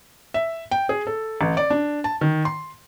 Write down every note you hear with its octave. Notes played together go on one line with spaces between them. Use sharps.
E5
G5
G#4
A4
A1
D5
D4
A5
D#3
C6